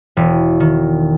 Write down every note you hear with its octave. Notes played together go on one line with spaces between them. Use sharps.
E1
D#3